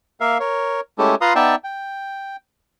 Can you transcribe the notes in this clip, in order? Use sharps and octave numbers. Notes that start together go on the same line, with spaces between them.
A#3 A#4 E5 F5
A#4 C#5
G#3 A3 C#4 E4 G4 A4
F4 B4 F5 A#5 C6 D#6
B3 D#4 D5 E5 G5 A5
G5